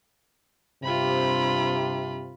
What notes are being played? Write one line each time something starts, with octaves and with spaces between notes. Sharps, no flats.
G2 C3 F4 B5